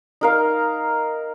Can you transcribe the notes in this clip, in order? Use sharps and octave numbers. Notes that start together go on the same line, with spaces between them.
D#4 A#4 F5